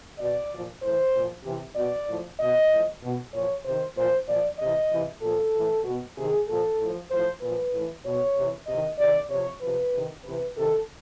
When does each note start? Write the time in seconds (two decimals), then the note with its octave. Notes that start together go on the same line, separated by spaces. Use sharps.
0.19 B2 D5
0.51 A#2 F3
0.82 A2 E3 C5
1.13 A#2 F3
1.44 C3 E3
1.76 B2 D5
2.08 A2 F3
2.40 B2 D#5
2.70 A2 F3
3.02 B2
3.33 A#2 F3 C#5
3.64 C3 D#3 C5
3.96 A#2 F3 C5
4.27 A#2 F3 D5
4.59 C3 E3 D#5
4.90 C3 E3
5.22 A#2 F3 A4
5.54 A2 E3
5.84 B2
6.16 C3 D#3 G#4
6.48 A#2 F3 A4
6.78 A2 F3
7.11 A2 F3 C5
7.42 A#2 F3 B4
7.73 A2 E3
8.04 B2 C#5
8.36 C3 E3
8.67 C3 D#3 D#5
8.99 C3 D#3 D5
9.30 C3 F3 C#5
9.61 C3 F3 B4
9.94 C3 D#3
10.24 C3 E3 B4
10.56 C3 D#3 A4